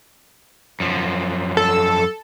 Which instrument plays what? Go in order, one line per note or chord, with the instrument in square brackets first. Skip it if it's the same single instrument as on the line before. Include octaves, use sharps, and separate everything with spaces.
[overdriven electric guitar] F#2 F3
[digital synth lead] A4